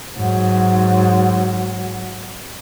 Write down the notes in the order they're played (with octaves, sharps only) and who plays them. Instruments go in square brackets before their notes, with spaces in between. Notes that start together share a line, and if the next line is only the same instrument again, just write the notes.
[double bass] G#2 F#3